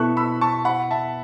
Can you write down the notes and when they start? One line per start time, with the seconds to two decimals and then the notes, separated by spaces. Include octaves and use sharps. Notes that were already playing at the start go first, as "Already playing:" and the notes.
Already playing: B2 B3 E4 A4 C#6 F#6
0.17 B5 E6
0.41 A5 C#6
0.65 F#5 B5
0.91 E5 A5